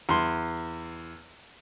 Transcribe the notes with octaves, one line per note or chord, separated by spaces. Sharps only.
E2 C6